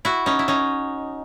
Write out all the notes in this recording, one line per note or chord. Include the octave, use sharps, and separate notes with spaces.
E4 F#4
C#4 D#4
E4
C#4 D#4